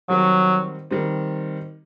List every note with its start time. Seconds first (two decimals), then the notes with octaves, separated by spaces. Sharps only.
0.09 D#3 F#3 G3 C4
0.91 D#3 G3 C4